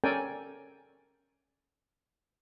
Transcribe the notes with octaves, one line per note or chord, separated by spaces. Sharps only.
C#4 A4 A#4 D5 G5 G#5